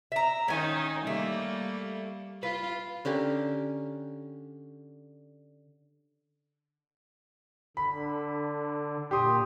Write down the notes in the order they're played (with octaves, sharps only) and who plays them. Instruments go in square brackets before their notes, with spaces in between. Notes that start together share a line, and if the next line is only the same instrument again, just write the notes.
[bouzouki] E5 A#5
[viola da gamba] D#3 D#4 [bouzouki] C#4 G#5
[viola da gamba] G3 A#3 [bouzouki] A3
[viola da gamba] F4 [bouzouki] B4
[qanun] D3 C#4 G4 A#4
[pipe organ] D3 [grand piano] B5
[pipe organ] A#2 [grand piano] G4 C6 D#6